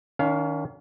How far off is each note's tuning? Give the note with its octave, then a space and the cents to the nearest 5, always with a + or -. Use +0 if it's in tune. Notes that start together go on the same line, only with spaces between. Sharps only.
D#3 +0 C#4 +40 F5 +0